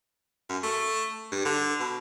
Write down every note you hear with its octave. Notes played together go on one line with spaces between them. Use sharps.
F#2
A3
G2
D3
B2